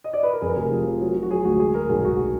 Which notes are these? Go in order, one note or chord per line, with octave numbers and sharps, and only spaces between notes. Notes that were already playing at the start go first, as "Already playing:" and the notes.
D#5
D5
B4
A#4
F2 G#4
A#4
F1 G#4
F3
F3
F#3
F#3
F#4
F#3 G#4
D2 F#4
G#3 G#4
G#3 A#4
B1 G#4
B1 F#4